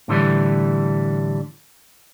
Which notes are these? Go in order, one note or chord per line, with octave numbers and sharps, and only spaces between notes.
A2 D3 E3 G3